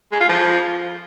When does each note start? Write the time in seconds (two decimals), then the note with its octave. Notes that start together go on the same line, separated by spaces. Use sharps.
0.12 G#3
0.20 F4
0.29 F3